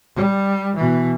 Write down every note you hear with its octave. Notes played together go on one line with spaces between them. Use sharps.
G3
B2 E3